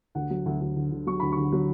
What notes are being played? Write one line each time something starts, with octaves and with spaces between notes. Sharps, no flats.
D2 F#5
F#3
D2
D2
D3
D3
F#3 C#6
D2 B5
D3 C#6
F#3